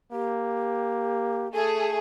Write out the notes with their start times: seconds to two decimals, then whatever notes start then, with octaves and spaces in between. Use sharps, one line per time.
0.12 A#3 G4
1.53 A3 G#4 A4